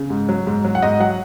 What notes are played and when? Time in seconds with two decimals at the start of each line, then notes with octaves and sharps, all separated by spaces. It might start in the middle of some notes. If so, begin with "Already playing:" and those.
Already playing: C#3
0.10 G#2
0.29 F#3
0.47 G#2
0.65 F#3
0.75 F#5
0.82 G#2 D#5
1.00 F#3 F#5